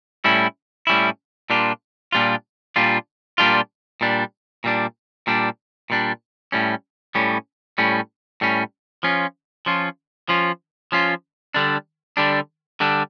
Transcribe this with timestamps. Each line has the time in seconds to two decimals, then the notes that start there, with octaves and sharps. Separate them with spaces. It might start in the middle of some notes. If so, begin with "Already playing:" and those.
0.24 A2 G3 C#4 E4
0.87 A2 G3 C#4 E4
1.50 A#2 G3 D4 F4
2.12 A#2 G3 D4 F4
2.76 A#2 G3 D4 F4
3.38 A#2 G3 D4 F4
4.01 A#2 G3 D4
4.64 A#2 G3 D4
5.27 A#2 G3 D4
5.90 A#2 G3 D4
6.52 A2 G3 C#4
7.15 A2 G3 C#4
7.78 A2 G3 C#4
8.41 A2 G3 C#4
9.03 F3 C#4 F4
9.66 F3 C#4 F4
10.29 F3 C#4 F4
10.92 F3 C#4 F4
11.54 D3 G3 D4
12.17 D3 G3 D4
12.80 D3 G3 D4